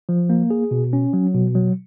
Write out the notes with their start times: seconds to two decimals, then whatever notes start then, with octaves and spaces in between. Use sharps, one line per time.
0.09 F3
0.29 A#3
0.50 G#4
0.71 B2
0.93 C#4
1.13 F#3
1.34 B2
1.55 F#3